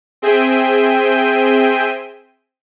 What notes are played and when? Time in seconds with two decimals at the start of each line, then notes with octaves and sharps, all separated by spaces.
0.22 C4 G#4 E5 G5 G6 D#7